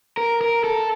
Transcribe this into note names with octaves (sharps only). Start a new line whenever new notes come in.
A#4
A#4
A4